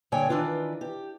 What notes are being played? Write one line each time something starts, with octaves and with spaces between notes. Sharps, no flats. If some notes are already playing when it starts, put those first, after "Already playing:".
G2 A#2 D3 C#5 G5 G#5
D#3 E3 D4 F4 B4
G4